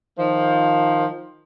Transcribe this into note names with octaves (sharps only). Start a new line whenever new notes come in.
D#3 F3